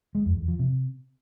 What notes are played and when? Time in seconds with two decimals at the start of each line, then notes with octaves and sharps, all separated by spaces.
0.15 G#3
0.26 F2
0.37 E2
0.48 F3
0.59 C3